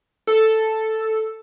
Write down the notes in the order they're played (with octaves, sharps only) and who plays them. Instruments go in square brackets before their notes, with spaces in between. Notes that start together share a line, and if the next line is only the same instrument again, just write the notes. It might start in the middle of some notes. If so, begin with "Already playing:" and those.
[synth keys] A4